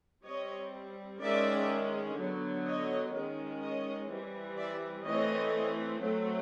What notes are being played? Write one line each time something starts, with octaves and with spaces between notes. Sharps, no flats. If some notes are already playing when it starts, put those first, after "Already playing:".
G3 C4 C#5 D#5
D#3 G#3 C#4 D5 E5
D3 F#3 B3
C#5 D#5
D#3 G#3 C#4
C#5 D#5
E3 G3 C4
D5 E5
E3 A3 C4 C#5 D#5
F#3 A3 C4